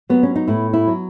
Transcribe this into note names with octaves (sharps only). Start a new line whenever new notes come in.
F#3 B3
C#4
D#4
A2 E4
E4
F#3